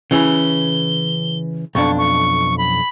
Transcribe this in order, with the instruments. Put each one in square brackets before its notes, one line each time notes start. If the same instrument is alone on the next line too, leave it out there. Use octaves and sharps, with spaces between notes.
[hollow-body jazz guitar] C#3 E3 C#4 [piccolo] G7
[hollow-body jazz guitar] B1 F2 D4 [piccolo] C#6
[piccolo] C#6
B5